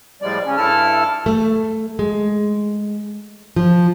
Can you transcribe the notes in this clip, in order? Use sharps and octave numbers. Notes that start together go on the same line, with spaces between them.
A2 F3 G3 G#3 D5
C#3 C#4
G2 E4 A4 A5 F6
A3
G#3
F3